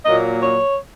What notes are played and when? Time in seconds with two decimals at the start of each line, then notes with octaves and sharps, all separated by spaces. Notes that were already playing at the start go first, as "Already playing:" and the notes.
0.06 A#2 F#3 A#3 D#5
0.43 C#5